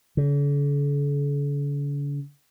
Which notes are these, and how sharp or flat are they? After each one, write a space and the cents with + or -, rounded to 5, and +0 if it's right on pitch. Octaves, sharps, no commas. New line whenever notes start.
D3 -45